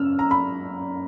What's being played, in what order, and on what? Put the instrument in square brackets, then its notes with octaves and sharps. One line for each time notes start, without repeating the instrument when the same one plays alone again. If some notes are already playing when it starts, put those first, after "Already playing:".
Already playing: [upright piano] F#2 C#3 E6 F6
A#5
B5